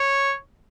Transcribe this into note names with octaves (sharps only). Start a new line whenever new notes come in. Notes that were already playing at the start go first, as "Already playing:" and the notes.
Already playing: C#5